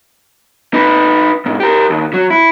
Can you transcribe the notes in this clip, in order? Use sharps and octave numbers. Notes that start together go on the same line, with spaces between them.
D#4 B4
B1 G#2
G4 A#4
D#2
F#3
E4